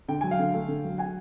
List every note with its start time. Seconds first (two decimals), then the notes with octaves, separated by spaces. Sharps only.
0.08 D3 G5
0.21 F#3 G#5
0.31 F5 G5
0.39 D3
0.54 A3
0.68 D3
0.84 F#3
0.98 F#5 G#5